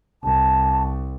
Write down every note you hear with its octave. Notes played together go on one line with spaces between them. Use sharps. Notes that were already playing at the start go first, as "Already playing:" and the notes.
C2 A5